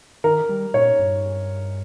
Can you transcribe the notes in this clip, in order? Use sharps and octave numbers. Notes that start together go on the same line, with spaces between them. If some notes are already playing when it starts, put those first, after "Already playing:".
D#3 A#4
G3
A#2 C#5
G2